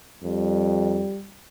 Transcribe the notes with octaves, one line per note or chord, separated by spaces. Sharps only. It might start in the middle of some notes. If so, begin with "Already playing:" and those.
F2 G3